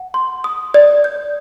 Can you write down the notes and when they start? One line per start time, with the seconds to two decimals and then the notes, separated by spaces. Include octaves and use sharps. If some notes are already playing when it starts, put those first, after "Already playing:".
Already playing: F#5
0.14 C6
0.44 D#6
0.74 D5
1.04 G6